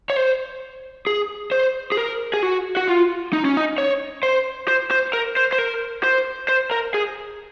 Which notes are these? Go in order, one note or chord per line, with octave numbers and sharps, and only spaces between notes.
C#5
C5
G#4
C5
G#4
A#4
G#4
F#4
F#4
F4
D#4
C#4
D#4
C#5
C5
C5
C5
A#4
C5
C5
A#4
C5
C5
A#4
G#4